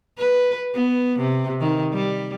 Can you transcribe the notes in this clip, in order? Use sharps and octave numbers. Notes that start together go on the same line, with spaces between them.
B4
B3
C3
D#3
G3